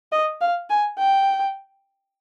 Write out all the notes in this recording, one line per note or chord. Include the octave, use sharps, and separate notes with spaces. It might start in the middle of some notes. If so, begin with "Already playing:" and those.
D#5
F5
G#5
G5